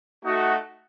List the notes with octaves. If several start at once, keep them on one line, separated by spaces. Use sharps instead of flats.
A3 D#4 F#4